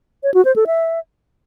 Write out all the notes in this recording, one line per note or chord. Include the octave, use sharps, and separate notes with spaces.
C#5
F#4
C5
A4
E5